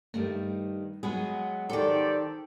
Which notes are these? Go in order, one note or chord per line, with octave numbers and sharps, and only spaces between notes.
G2 D#3 G3 A3
F#3 G#3 B3 G#4
D#3 G4 A4 C5 D5